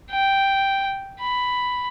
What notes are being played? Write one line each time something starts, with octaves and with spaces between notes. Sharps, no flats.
G5
B5